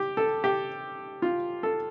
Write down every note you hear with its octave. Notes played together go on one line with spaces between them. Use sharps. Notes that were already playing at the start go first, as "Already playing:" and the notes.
Already playing: G4
A4
G4
F4
A4